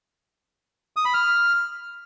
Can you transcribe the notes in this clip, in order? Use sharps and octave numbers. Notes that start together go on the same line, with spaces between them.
D#6
B5
F6